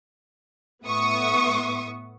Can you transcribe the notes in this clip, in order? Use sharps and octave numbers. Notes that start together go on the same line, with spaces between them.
A2 B3 E5 C#6 D#6